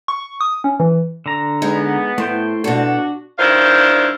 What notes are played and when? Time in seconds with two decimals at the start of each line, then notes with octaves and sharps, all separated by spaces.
0.08 C#6
0.41 D#6
0.64 C#4
0.80 E3
1.26 D3 A#5
1.62 G#3 B3 D#4
2.18 A2 A3 C5 G5
2.64 B2 D4 F#4 A4
3.39 G2 D#3 D4 E4 C5 F5